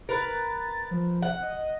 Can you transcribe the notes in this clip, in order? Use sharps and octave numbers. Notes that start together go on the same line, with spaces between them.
A#4 B4 A6
F3
F#5
D#5